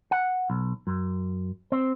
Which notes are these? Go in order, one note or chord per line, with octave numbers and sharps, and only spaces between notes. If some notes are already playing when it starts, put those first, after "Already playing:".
F#5
B1
F#2
C4